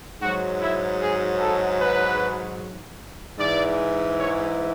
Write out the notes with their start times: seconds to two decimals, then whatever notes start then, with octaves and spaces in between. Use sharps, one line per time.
0.20 G#2 F#3 F#4
0.60 E4
1.00 G#4
1.40 A4
1.79 B4
3.38 G#2 E3 D5
4.18 C#5